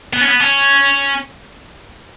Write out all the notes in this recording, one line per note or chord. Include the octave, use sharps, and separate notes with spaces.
B3
C#4
B3
C#4